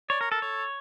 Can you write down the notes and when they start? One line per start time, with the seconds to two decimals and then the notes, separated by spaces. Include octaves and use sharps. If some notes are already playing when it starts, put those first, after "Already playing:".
0.09 C#5 D5
0.21 A#4 C#5
0.31 A4 A#4
0.42 A4 C#5